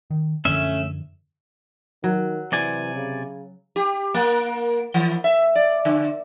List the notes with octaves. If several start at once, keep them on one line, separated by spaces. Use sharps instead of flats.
D#3
F#2 D3 F3 A3 C#4 E5
D#3 F#3
C3 E3 D5 G#5
C#3
G4
A#3
E3
E5
D5
D3